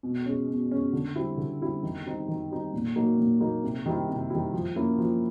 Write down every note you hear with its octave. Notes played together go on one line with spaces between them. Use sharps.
B2
G#3 C#4
B2
G#3 C#4
D3
G3 C4 E4
D3
G3 C4 E4
D#3
G3 C4 D#4
D#3
G3 C4 D#4
A#2
F#3 A#3 D#4
A#2
F#3 A#3 D#4
C3
D#3 G3 C4 E4
C3
D#3 G3 C4 E4
F3
A#3 C#4 E4
F3